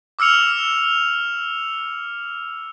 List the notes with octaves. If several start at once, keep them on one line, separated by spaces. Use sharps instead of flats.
D6 E6 F6 C#7 F7